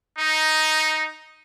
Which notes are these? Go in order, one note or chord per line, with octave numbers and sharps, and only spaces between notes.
D#4